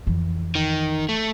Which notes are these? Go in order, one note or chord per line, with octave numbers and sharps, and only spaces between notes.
F2 E3
D#3
A3